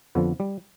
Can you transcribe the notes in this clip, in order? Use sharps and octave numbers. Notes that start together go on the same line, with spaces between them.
F2 D3 F3 B3
G3